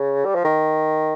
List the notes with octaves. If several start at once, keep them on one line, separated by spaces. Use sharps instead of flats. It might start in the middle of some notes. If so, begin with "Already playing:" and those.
Already playing: C#3
G3
F3
D#3